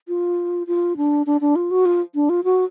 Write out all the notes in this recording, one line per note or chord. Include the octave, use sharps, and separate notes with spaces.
F4
F4
D4
D4
D4
F4
F#4
F4
D4
F4
F#4